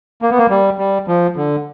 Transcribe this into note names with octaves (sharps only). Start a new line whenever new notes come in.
A#3
B3
A#3
G3
G3
F3
D3